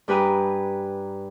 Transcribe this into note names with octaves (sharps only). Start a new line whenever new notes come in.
G2 G4 B4 G#5 A#5 D#6